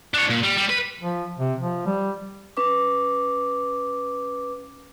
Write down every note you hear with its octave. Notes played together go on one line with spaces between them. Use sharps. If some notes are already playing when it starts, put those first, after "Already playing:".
D4 C#5
A#2
G3
G3
B4
F3
C3
F3
G3
C#4 B4 D6